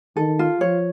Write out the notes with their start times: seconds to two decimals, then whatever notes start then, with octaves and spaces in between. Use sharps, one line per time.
0.17 D#3 A4
0.39 F4
0.61 F3 C#5